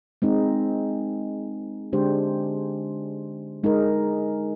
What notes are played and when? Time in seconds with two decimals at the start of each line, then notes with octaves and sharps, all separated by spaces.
0.22 G#3 C4 D#4
1.93 D3 G#3 D4 G4 C5
3.64 G#3 D#4 A#4